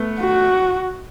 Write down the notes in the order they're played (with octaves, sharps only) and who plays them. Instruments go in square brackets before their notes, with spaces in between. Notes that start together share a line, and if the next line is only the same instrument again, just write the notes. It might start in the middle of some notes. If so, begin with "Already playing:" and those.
Already playing: [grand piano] A3 B3
[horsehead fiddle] F#4